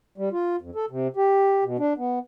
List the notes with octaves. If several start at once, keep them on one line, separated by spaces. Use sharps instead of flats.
G3
F4
F2
A4
C3
G4
B2
D4
B3